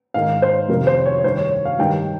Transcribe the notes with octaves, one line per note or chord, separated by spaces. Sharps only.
G#2 D#3 F5
C5
F2 C3 D#3 A#4
C5
C#5
G2 D#3 C5
C#5
F5
G2 D#3 G5